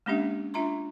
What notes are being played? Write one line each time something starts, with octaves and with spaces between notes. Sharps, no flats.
G#3 A#3 C#4 D4 G4 E5
D4 F4 E5 A#5 C6